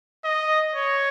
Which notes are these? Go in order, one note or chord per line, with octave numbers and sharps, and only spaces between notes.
D#5
C#5